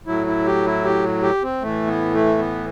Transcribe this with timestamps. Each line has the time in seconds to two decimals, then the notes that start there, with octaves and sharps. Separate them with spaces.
0.07 A2 F#3 E4
0.27 E4
0.45 G4
0.66 E4
0.84 G4
1.23 G4
1.43 C4
1.62 A2 E3 A3
1.87 B3
2.13 A3
2.38 B3